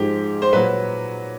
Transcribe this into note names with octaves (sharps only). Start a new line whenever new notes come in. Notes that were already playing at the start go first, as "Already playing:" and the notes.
Already playing: G#2 F3 G#3 G4
C5
A#2 F#3 B4